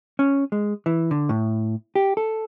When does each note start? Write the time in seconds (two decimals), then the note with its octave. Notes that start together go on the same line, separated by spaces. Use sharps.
0.19 C#4
0.52 G#3
0.86 E3
1.11 D3
1.29 A2
1.95 G4
2.17 A4